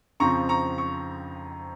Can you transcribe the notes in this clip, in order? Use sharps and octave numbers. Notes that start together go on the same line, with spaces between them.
F2 C#3 F3 C4 A#5 C#6
A#5 C#6
C#6